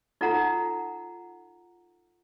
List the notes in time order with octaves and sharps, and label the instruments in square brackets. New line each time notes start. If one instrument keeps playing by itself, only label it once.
[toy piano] D#4 F4 A4 F#5 A#5